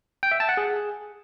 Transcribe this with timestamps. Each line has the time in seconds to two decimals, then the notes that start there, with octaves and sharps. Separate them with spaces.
0.23 G5
0.31 E5
0.40 A5
0.49 F#5
0.57 G#4